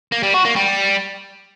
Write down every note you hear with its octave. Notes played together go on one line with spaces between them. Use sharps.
A#3
G3
F#4
A#3
G3